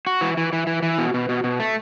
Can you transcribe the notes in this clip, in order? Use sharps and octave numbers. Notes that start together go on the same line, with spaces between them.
F#4
E3
E3
E3
E3
E3
B2
B2
B2
B2
A3